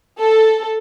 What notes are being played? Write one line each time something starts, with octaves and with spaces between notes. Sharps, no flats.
A4